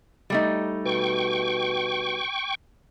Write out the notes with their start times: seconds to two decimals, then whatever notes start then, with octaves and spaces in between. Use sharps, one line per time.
0.30 G3 A3 D#4
0.85 B2 G5 C#6